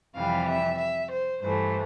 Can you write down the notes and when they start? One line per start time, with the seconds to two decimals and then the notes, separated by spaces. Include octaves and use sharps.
0.16 F2 C3 E3 G3 F5
0.49 E5
0.80 E5
1.12 C5
1.43 G2 E3 A3 C5